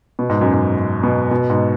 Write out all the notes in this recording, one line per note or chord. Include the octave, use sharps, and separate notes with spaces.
B2
G#2
F#2
G#2
B2
B2
G#2